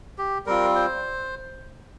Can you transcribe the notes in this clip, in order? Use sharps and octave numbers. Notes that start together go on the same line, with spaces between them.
G4
G3 C4 F4 A#4
C5